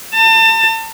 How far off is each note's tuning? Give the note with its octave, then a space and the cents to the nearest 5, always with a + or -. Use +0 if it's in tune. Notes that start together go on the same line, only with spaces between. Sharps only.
A5 +35